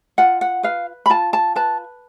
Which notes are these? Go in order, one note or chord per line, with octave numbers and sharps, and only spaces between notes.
F4 F#5
F#5
B4 F5
B5
F4 A5
A5
B4 A5